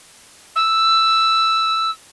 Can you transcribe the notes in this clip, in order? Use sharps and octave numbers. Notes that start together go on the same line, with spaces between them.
E6